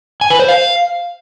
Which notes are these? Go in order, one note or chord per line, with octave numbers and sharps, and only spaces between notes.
G#5
B4
C5
F5